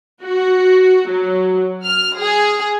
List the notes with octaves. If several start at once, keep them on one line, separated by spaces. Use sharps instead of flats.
F#4
F#3
F6
G#4